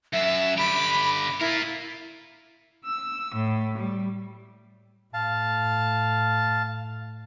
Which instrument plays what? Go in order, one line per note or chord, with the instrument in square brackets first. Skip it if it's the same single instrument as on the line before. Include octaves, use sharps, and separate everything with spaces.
[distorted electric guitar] F#2 [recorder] E5
[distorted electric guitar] D3 G4 [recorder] B5
[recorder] E4 [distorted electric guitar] F4 A#4
[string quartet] E6
A2
G3
[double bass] A2 [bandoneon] F5 A5